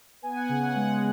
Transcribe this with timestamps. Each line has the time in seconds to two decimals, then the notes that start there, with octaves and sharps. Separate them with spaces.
0.22 B3 G#5
0.36 F#5
0.49 C#3 G#5
0.62 F#5
0.75 G#3 F#5